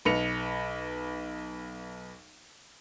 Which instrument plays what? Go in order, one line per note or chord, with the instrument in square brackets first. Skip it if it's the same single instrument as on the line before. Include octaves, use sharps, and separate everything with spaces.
[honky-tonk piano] B1 B4 C#7 F7